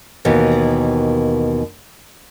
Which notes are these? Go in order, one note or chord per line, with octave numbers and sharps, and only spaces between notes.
D#2 B2 E3